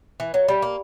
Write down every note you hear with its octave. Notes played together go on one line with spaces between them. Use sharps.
E3
F#3
G3
A#3